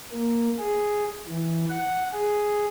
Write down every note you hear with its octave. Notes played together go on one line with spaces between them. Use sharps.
A#3
G#4
E3
F#5
G#4